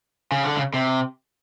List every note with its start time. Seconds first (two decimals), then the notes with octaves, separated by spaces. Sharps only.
0.32 C#3
0.44 D3
0.57 C#3
0.74 C3